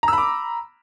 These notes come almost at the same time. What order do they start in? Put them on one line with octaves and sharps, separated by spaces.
A#5 E6 B5 D6